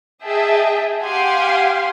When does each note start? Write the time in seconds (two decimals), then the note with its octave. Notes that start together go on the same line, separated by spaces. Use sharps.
0.22 G#4 D#5 E5 G5 A5
1.02 G4 F5 F#5 G#5 C6